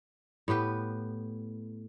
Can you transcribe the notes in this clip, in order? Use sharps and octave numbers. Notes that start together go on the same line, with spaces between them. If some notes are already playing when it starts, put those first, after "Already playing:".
A2 B3 G4 B4